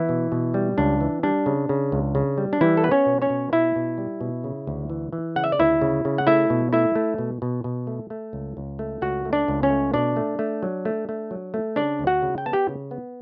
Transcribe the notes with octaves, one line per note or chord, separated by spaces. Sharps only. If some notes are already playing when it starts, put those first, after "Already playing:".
Already playing: E3 B3 E4
B2
B2
G3
C#2 D4
E3
G3 D4
C#3
C#3
C#2
C#3
G3
D4
E3 G3 E4
A4
B3 B4
C#4 C#5
B2
C#4 C#5
B2
B2 E4 E5
B2
G3
B2
C#3
D2
E3
E3
C#3 F#5
E5
D5
D2 E4 E5
C#3
C#3
F#5
A3 E4 E5
B2
A3 E4 E5
A3
B2
B2
B2
A3
A3
C#2
C#2
A3
C#2 F#4 F#5
A3
D4 D5
C#2
C#4 C#5
A3
B2 D4 D5
A3
A3
F#3
A3
A3
F#3
A3
C#3 D4 D5
D2
F#4 F#5
C#3
G5
B3 A5
G4 G5
C#3
B3